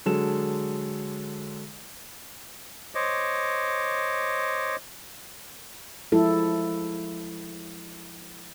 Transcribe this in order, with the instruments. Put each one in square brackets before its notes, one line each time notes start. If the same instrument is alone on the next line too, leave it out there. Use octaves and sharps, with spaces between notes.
[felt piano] D3 F#3 G#3 A4 E7
[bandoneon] C5 C#5 D#5 D6
[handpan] F3 G#3 E4 A4